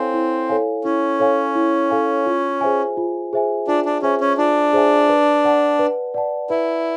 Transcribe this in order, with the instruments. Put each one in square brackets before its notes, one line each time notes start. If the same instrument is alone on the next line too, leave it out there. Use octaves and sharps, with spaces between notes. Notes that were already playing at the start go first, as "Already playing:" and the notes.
Already playing: [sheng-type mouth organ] C4 [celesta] E4 A4 C#5 F5 G#5
[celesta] E4
A4 C#5 F5 G#5
[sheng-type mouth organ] C#4 [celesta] E4
[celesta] A4 C#5 F5 G#5
E4
A4 C#5 F5 G#5
F4
G#4 C5 E5 G#5
F4
G#4 C5 E5 G#5
[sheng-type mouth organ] D4 [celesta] F4
[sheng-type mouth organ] D4
[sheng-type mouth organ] C#4 [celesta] G#4 C5 E5 G#5
[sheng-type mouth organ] C#4
[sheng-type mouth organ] D4 [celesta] F4
[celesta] G#4 C5 E5 G#5
B4
D5 F#5 A5
B4
D5 F#5 A5
[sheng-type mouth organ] E4 [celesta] B4